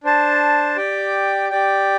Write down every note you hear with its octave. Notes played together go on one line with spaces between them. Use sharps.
D4 C5 A5
G4 D5 G5
G4 D5 G5